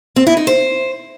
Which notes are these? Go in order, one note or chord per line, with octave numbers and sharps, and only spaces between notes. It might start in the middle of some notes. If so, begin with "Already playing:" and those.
C4
E4
D#4
C5